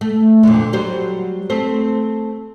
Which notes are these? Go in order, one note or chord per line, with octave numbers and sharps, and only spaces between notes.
A3
F2 A#2 D3
F#3 G3 C5
A3 C4 C5